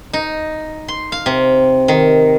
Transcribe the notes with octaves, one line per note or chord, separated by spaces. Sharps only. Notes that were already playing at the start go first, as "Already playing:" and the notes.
D#4
C6
F5
C3
D#3